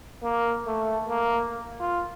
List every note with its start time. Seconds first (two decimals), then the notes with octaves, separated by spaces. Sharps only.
0.23 A#3
0.66 A3
1.08 A#3
1.80 F4